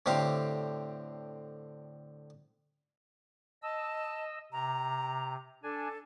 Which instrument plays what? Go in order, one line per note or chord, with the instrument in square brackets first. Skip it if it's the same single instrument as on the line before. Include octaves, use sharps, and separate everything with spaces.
[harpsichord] A2 D3 C4 G4 F5
[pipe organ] D#5 E6 [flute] A5
[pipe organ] C3 [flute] A#5
[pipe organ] D4 G#5 [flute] A4